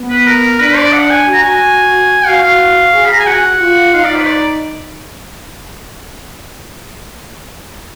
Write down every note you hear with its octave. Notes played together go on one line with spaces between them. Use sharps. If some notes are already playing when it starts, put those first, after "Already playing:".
Already playing: B3
B4
A#4
D4 B4
D5
F#5
G#5
F#4
A#5
G#5
F#4 F5
F5
G#4
B5
A#5
G#5
F#4 F#5
F4
D#4 F5
D5
B4
D5